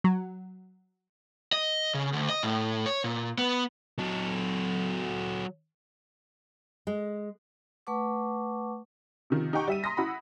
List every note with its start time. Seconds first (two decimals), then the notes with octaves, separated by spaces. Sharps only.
0.04 F#3
1.53 D#5
1.94 C#3
2.13 D2
2.29 D#5
2.43 A2
2.86 C#5
3.04 A#2
3.38 B3
3.99 F#3 A4
6.87 G#3
7.87 A3 B4 F#5 A5 C#6 D6
9.30 C3 D#3 F3
9.53 D#4 G4 F#5 G5 C#6
9.68 G3 E5 D#7
9.83 A#5 C6 D#6 A#6 B6
9.97 E4 F#5 B5